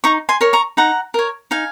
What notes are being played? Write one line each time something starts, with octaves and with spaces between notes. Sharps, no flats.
D#4 A#5 C#6
G#5 C6
A#4 C#5
A#5 C#6
D#4 F#5 A#5
A#4 C#5
D#4 F5 G#5